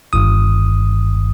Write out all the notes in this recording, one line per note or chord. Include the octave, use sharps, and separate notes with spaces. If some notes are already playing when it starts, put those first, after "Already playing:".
G1 G2 D#3 D#6